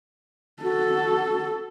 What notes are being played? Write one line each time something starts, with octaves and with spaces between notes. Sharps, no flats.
F#4 A4